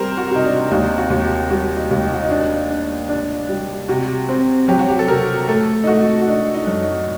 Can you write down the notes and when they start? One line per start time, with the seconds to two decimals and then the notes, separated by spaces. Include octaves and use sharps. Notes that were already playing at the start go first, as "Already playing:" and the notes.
Already playing: C3 G3 A#4 C5
0.17 F#4
0.31 C3 D#4
0.45 D4
0.71 D#2 D#4
0.98 F#4
1.10 D#2
1.23 G4
1.50 G3 F#4
1.76 D#4
1.91 D#2
2.03 D#4
2.13 F#4
2.22 D#4
2.30 D4
2.70 D4
3.09 D4
3.49 G3
3.88 C3 F#4
4.29 C4
4.68 F#3 G4
4.79 F#4
4.89 G4
4.99 A4
5.08 C3 A#4
5.48 A3 A4
5.84 D#4
5.87 A3 F#4
6.21 F#4
6.27 D4 D#4
6.54 D#4
6.67 F#2
6.81 D#4